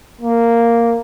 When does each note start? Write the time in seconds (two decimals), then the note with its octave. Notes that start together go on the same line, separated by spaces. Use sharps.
0.21 A#3